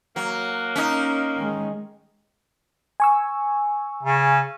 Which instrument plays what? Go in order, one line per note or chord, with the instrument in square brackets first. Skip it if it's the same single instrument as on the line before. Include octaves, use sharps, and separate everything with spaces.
[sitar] F#3 [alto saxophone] A#3
[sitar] C#4 D#4
[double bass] D#3 G#3
[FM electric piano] G#5 C#6 E6
[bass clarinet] C#3